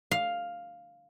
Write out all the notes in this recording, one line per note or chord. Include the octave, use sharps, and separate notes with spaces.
F5